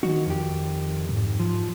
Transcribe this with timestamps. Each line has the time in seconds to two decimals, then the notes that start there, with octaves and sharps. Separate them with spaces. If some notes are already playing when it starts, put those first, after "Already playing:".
0.03 D#3 D#4 F#4
0.26 F2 G4
1.09 G#2
1.40 F3